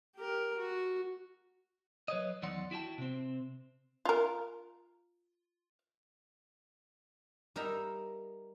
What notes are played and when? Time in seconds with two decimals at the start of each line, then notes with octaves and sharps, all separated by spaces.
0.16 G4 A#4
0.58 F#4
2.08 F#3 B4 C#5 D#5
2.42 E2 D#3 F#3 D5 F#5 C6
2.71 E4 F#4 G5 A5
2.98 C3 C4
4.05 F4 A#4
7.56 G3 D#4 A#4 E5 G5 A#5